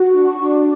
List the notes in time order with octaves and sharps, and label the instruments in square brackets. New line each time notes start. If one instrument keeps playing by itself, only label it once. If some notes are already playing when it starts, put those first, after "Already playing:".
Already playing: [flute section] F#4
D4
C#6
D4